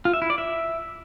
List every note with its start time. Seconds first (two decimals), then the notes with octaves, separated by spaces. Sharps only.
0.05 F4
0.13 E5
0.22 E4
0.30 D5
0.38 E5